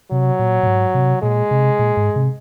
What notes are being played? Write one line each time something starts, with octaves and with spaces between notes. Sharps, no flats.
C3 F#3
A#2
A#2
G#2
C3
A#2 G#3
C3
A#2
G#2
C3